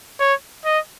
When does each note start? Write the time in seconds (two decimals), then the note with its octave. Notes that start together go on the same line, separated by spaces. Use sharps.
0.20 C#5
0.65 D#5